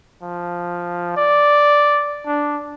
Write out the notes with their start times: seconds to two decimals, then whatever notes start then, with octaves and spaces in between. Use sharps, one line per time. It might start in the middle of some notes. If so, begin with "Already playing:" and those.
0.22 F3
1.17 D5
2.26 D4